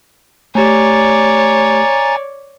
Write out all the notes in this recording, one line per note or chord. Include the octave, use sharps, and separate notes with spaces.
A3 G4 C#5 D5 G#5 A#5 A6